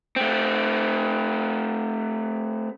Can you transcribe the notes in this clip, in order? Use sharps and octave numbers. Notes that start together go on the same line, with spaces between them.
A3 C4